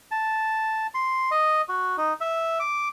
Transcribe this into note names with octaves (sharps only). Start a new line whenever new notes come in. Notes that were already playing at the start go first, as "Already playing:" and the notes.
A5
C6
D#5
F#4
D#4
E5
D6